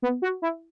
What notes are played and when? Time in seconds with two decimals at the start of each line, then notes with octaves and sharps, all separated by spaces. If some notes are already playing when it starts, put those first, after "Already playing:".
0.02 B3
0.22 F#4
0.42 E4